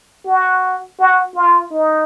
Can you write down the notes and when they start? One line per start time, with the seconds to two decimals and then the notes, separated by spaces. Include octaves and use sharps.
0.26 F#4
0.99 F#4
1.35 F4
1.71 D#4